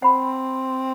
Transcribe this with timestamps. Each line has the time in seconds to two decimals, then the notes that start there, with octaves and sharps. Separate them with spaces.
0.02 C4 C5 F#5 B5